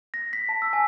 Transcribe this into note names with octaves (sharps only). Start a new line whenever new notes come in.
A#6
B6
A5
E6
G#5